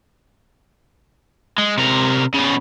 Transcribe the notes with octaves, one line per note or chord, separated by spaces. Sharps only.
G#3
C3 A#4
C#3 B3